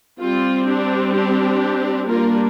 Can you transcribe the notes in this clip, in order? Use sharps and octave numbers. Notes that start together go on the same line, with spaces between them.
G3 C4 F4
D4 G4
D4 G4
G3 A#3 D4 F4 A#4